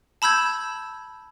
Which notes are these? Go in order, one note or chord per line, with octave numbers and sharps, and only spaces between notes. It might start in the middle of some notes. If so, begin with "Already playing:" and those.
A5 B5 E6 G6 G#6